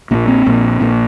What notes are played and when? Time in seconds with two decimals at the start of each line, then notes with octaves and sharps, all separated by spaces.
0.11 A#1 A#2 A#3
0.28 C4
0.46 A#1 A#2
0.81 A#1 A#2